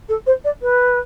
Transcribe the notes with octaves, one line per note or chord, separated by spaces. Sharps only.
A4
C5
D5
B4